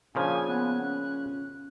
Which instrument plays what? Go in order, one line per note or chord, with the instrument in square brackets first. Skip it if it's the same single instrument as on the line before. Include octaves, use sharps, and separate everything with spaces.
[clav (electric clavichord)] A#2 C#3 F3 [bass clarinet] D4 [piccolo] G#5
[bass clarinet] B3 [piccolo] F#6
[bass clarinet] C#4